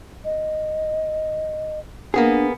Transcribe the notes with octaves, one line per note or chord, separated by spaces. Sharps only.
D#5
A#3 B3 D4 G#4